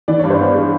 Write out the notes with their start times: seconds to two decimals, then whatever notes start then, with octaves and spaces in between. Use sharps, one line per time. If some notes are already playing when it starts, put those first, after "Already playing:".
0.08 E3 D5
0.19 G2 C#5
0.30 C5
0.40 B3 C#5
0.55 G#3